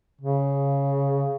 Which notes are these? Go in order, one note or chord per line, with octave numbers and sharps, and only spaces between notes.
C#3